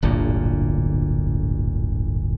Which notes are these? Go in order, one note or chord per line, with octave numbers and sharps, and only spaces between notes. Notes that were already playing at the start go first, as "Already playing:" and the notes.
D1 G1 A#2 D3